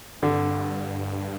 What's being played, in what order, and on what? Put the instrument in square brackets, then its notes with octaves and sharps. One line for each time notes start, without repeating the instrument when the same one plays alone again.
[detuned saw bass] G2 [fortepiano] D3